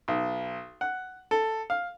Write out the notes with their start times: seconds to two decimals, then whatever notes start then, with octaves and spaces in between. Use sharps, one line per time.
0.08 B1
0.81 F#5
1.31 A4
1.70 F5